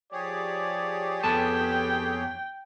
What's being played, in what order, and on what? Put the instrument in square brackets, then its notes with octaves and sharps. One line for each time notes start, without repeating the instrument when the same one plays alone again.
[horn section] F3 D5 [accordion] G4 G#4 C#5
[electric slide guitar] F2 B3 A5 [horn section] A4 [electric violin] G5